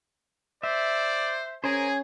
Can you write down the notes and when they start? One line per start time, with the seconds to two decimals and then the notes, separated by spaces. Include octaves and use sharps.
0.63 C5 D5 E5
1.64 C#4 G#4 A#4 C5 C#5 G#5